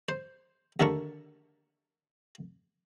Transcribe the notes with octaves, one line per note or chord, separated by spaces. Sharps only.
C5
D#2 D3 A3 A#4 A5 C#6